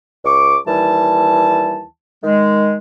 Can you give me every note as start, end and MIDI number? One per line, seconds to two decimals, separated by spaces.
0.25 0.57 37
0.25 0.57 85
0.25 0.57 86
0.67 1.84 39
0.67 1.84 52
0.67 1.84 55
0.67 1.84 81
2.24 2.77 51
2.24 2.77 56